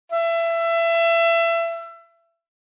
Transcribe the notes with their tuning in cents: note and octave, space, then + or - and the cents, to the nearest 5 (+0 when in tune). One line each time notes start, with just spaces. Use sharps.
E5 +25